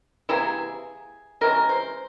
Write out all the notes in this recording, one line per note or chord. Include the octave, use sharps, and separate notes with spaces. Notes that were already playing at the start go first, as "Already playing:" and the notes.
C3 E3 A#3 E4 G#4
C3 E3 G#3 C#4 A#4
C5